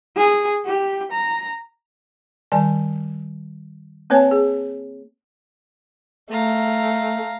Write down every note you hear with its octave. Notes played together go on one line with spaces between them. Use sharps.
G#4
G4
A#5
D#3 G3 D5 G#5 A5
A#3 C4 B4 C#5 G#5 A5
G#4
A3 F5 A#5